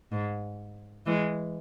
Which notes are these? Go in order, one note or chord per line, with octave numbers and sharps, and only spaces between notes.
G#2
E3 G#3